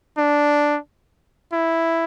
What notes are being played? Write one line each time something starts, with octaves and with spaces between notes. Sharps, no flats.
D4
E4